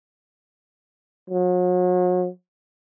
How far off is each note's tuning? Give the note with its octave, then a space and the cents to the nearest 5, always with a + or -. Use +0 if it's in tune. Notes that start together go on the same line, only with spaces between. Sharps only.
F#3 -40